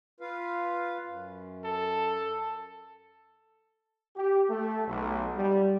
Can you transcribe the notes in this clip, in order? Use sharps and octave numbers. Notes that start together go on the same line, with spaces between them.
F4 B4 F5
F#2
A4
G4
A3
B1
G3